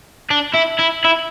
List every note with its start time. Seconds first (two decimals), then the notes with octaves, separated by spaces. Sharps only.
0.31 D4
0.54 E4
0.79 E4
1.05 E4